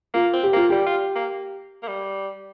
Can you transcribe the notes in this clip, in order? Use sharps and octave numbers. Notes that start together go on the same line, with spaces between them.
A#3 F4
C4
G4
A#3 F4
G3 G4
F4
A#3
A#3
G3